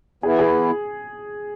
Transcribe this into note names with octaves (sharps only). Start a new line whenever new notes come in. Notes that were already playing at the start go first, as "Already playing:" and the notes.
E3 B3 E4 G#4
G#4